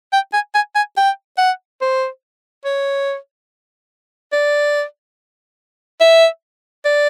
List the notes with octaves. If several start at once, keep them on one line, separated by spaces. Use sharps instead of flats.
G5
G#5
G#5
G#5
G5
F#5
C5
C#5
D5
E5
D5